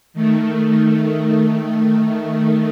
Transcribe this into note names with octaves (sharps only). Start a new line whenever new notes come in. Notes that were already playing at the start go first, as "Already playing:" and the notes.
D#3 A3